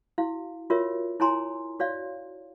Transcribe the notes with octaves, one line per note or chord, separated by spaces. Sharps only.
E4 F#4 F5
F4 F#4 A#4 C#5 E5
E4 C#5 G#5 A#5 C6
F#4 C#5 D5 F5